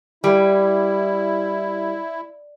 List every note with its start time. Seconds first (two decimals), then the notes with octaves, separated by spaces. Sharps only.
0.24 G3 E4